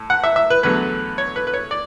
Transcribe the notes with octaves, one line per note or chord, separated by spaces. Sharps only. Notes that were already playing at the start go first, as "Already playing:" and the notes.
Already playing: A2
F#5
E5
E5
B4
E2 D3 F#3 A3 B4
C#5
B4
B4
C#5
D5